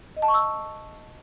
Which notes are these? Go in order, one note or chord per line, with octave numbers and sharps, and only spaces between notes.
D#5
A5
C#6
E6